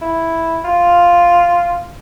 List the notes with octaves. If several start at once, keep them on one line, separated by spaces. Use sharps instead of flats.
E4
F4